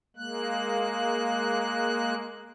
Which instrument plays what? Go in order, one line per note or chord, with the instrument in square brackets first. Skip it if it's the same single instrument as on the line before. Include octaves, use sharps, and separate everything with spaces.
[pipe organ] G#3 A#3 F#6